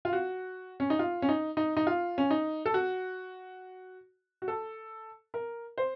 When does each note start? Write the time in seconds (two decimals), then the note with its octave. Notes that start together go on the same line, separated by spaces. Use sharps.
0.05 F4
0.13 F#4
0.80 C#4
0.90 D#4
0.99 F4
1.22 C#4
1.29 D#4
1.57 D#4
1.77 D#4
1.87 F4
2.18 C#4
2.31 D#4
2.66 A4
2.74 F#4
4.42 F#4
4.48 A4
5.34 A#4
5.78 C5